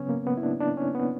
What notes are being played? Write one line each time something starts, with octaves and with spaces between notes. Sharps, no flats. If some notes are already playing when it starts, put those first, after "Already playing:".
Already playing: C#3 F#3 B3 C#4
A#3
B3
E4
D4
D4
C#4
B3